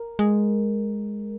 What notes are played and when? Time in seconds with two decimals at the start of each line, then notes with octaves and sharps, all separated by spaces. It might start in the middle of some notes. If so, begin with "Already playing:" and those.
Already playing: A#4
0.19 G#3